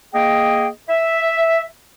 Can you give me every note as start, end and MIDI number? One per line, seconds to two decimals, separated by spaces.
0.14 0.68 58
0.14 0.68 68
0.14 0.68 75
0.14 0.68 79
0.89 1.64 76